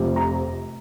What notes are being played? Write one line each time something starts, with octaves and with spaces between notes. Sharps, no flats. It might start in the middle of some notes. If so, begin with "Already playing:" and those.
Already playing: F1 F2 C3
A#5